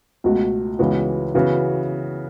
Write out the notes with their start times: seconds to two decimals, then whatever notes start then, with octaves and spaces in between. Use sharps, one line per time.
0.24 C#2 B2 A3 F#4
0.79 C#2 C#3 E3 B3 F#4
1.34 C#3 E3 B3 F#4